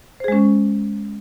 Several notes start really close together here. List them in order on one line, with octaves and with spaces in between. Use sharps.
C5 G#4 G#3 C#4